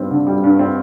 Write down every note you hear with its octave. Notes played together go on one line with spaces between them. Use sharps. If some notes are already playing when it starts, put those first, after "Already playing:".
Already playing: G2 G3 C4
D3
G3
G2
C4